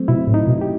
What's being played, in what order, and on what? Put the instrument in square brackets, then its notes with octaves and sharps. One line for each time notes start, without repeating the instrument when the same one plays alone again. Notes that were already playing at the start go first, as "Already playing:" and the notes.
Already playing: [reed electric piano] F#3 A3 C4
[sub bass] B2 [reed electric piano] E4
[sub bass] A2
[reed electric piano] D#4
[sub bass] B2
[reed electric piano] G4